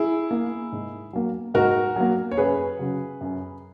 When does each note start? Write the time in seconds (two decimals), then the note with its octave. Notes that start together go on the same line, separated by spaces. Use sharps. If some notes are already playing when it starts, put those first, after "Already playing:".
Already playing: E4 G#4
0.31 A#3
0.72 G#2
1.13 F#3 A#3
1.54 G#2 F#4 A#4
1.96 F#3 A#3
2.31 C#5
2.37 F#2 G#4 B4
2.79 C#3 F#3
3.21 F#2